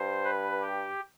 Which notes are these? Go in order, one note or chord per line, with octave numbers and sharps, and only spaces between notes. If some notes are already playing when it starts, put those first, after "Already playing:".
Already playing: G2 C5
B4
G4